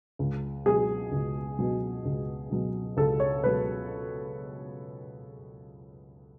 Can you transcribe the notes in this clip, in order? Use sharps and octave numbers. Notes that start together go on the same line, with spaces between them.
C#2
B2 F#3 G#4
C#2
B2 F#3
C#2
B2 F#3
C#2 A4
C#5
B2 F#3 B4